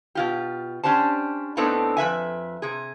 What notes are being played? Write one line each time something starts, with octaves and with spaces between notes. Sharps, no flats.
B2 F4 G4
C#4 D4 G4 C5 A5
A2 B3 C4 D4 D#4 A4
F2 B4 E5 G#5
C3 G#4